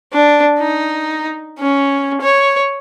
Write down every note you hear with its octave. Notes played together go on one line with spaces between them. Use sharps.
D4
D#4
C#4
C#5